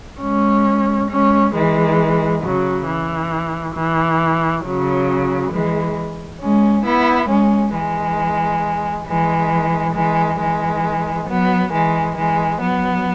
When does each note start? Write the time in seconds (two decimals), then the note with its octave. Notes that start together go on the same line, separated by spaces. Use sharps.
0.20 G#3 C#4
1.09 G#3 C#4
1.54 E3 G#3
2.42 C#3 F#3
2.86 E3
3.74 E3
4.63 C#3 F#3
5.51 E3 G#3
6.40 G#3 C#4
6.84 B3 E4
7.29 G#3 C#4
7.73 E3 G#3
9.06 E3 G#3
9.94 E3 G#3
10.39 E3 G#3
11.28 F#3 B3
11.72 E3 G#3
12.16 E3 G#3
12.60 F#3 B3